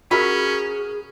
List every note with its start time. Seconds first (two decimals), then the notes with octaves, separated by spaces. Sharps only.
0.11 F#3 C#4 F#4 G#4 A#4 B5